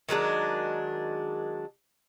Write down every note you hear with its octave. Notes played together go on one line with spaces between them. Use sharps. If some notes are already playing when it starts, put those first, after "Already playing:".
D#3 F#3 G#3 D4